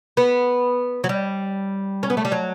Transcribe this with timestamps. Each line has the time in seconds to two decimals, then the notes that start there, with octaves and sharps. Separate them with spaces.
0.17 B3
1.04 F#3
1.09 G3
2.03 C#4
2.10 B3
2.17 A3
2.25 G3
2.32 F#3